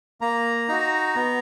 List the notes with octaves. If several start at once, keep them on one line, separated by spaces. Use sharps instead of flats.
A#3 A#5
D#4 F#4
B3